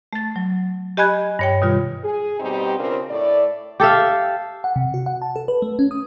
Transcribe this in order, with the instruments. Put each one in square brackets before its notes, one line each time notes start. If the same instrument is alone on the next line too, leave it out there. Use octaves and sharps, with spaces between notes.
[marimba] A3 A6
F#3
G4 D#5 G#5 B5 F#6 G#6
G2 C#5 G5
B2 D#3 G3 F4
[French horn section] G#4
B2 G3 C4 D#4 G4
C#3 C4 D4 F4 A#4
A2 A3 D5
[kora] G4 A4 E5 F5
[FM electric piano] F#5
C3
F#4
F#5
A5
A4
B4
A3
C#4
D#6